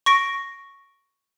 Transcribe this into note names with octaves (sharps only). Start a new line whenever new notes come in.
C#6 A#6 D7